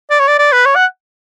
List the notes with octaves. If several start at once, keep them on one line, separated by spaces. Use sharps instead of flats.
D5
C#5
D5
D5
B4
C#5
F#5